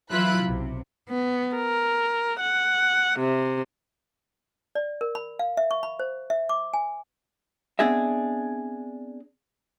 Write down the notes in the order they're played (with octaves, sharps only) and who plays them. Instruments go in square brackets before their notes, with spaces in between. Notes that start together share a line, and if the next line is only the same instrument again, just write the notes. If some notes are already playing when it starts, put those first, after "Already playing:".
[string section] E3 F#3 E4 F4 B5 F#6
B1 C3
[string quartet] B3
A#4
F#5
C3
[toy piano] D5
A#4
B5
F5
E5
C#6
B5
C5
E5
D6
G#5
[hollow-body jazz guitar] B3 C4 D4 G#4 D#5 E5